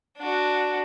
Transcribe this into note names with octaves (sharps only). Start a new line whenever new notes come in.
D4 F#4